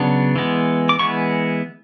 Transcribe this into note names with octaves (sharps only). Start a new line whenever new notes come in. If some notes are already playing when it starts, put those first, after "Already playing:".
Already playing: C#3 F#3 B3 D4
E3 G#3 B3
D6
E3 G#3 B3 C#6